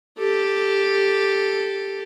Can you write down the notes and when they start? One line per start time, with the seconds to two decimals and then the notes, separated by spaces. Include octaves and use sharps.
0.18 G4 A4